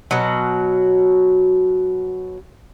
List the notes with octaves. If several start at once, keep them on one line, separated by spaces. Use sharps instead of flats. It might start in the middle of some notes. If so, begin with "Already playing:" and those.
B2 F#3